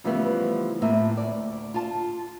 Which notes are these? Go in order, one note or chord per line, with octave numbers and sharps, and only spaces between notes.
C#3 E3 F3 G3 A3 B3
A2 A#3 C4 E5
D2 D5
F4 A5